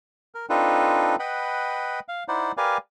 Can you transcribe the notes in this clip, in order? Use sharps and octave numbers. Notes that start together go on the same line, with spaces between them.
A#4
C4 D4 D#4 F4 A4 B4
B4 D#5 F#5 G5 B5
F5
D#4 E4 C5 D5 F#5
G4 A#4 B4 D5 F5 G#5